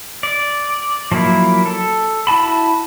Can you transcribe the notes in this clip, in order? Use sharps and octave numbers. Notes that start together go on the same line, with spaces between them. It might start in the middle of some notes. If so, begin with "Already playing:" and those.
D5
F3 F#3 A#3 E4
A4
E4 F#4 A5 B5